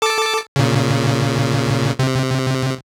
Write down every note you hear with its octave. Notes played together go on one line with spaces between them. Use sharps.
A4 A5 D6
A#2 C#3
C3